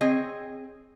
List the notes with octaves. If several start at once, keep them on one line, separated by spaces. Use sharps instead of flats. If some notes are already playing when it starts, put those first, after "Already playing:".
C4 G#4 C#5 D#5